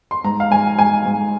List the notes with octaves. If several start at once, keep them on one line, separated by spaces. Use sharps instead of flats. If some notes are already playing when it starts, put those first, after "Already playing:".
C6
G#2 A#5
F5
G#2 G#5
G#2 G#5
G#2